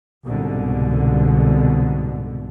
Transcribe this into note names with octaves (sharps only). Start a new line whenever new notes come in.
C2 G#2 B2 D3